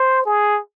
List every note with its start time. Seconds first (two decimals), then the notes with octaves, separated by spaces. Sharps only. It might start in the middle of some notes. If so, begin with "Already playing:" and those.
Already playing: C5
0.26 G#4